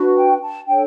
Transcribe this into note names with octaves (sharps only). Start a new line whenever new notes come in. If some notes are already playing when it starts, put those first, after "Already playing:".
Already playing: D4 F#4 B4
G5
A5
D4 A4 C#5 G5